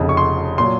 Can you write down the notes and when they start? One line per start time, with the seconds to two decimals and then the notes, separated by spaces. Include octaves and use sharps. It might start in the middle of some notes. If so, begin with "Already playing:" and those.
Already playing: F1 F2 C#3
0.09 C#6
0.17 C6
0.58 A#2 F#3 C6